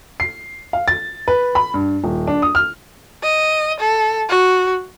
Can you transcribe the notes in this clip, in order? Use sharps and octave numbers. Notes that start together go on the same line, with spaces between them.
C7
F5
A6
B4
B5
G2
D#1
D4
D#6
F6
D#5
A4
F#4